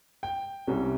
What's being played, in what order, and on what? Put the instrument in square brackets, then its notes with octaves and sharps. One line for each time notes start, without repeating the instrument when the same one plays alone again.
[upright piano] G5
C2 C3 G3 C#4